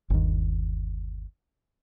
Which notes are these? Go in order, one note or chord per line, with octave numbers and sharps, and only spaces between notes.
G1 D#2